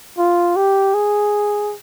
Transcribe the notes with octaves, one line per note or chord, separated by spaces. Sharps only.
F4
G4
G#4